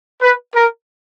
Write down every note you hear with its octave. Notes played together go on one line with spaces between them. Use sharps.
B4
A#4